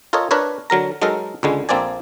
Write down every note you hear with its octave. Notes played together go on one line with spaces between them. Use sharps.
F4 A4 A#4 C#5 D#5
D4 A#4 B4 C#5
D3 F#3 A#4 A#5
F#3 G#3 D#4 A4 A#4
C#2 D3 G#3
A#1 A#3 C4 A4 D5 G#5